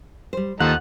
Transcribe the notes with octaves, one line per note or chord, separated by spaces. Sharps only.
G3 C5
D#2 D#3 F3 D#4 A4 F#5